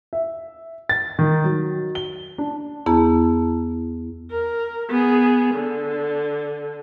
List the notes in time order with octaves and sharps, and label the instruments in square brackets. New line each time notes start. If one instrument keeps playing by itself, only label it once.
[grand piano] E5
A6
D#3
F#3
G7
D4
[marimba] E2 B3 E4 G#4 A5 A#5
[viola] A#4
B3 G#4
D3